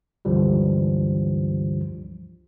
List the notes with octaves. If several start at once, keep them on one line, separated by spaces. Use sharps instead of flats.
C#2 G2 D3 E3 F3 G3